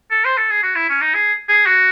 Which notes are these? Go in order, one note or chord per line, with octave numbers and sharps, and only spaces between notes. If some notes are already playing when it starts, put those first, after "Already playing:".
A4
C5
A4
G#4
F#4
E4
C#4
D#4
G#4
G#4
F#4